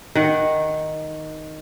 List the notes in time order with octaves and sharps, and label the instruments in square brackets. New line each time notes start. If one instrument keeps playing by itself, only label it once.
[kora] D#3 F#5